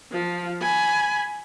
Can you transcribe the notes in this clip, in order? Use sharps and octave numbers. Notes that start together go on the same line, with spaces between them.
F3
G#5 B5